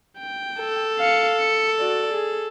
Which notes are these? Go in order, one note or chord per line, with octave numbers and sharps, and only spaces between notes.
G5
A4
F5 C#7
C#7
F#4 D5
G#4